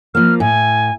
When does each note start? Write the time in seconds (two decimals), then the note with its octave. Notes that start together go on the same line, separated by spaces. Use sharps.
0.15 F3 A#3 F6
0.40 A2 G#5